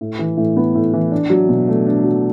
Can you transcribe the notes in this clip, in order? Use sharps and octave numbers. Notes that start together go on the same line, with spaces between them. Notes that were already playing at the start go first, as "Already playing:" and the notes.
A2
E3
A2
B3
A2
E3
D4
F#3
B2
A3
D4
F#3